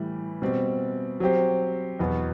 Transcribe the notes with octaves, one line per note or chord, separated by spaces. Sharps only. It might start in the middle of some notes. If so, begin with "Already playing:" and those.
Already playing: A2 E3 G3
B2 G3 C4
F#3 C4 G4 C5
E2 B2 F#3 B3